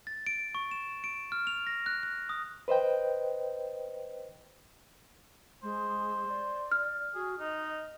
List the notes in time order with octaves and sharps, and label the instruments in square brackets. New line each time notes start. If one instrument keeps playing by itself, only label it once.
[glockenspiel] A6
D7
C#6
E7
D7
F6
F7
A#6
F#6
F#6
D#6
[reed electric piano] B4 C5 D#5 G5
[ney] G#3 [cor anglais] C5
[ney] D5
[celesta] F6
[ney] F#4 [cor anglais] G#4
[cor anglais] D#4 [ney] D#5